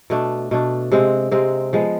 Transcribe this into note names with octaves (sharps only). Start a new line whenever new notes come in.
B2 A3 D4
B2 A3 D4
C3 G#3 C4
C3 G#3 C4
F3 G#3 B3